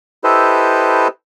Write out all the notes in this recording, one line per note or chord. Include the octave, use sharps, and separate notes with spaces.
E4 G4 A4 B4 C5 D#5